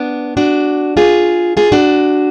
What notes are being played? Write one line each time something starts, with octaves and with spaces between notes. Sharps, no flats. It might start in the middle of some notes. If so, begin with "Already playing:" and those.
Already playing: B3 D4
D4 F#4
F4 G#4
F4 G#4
D4 F#4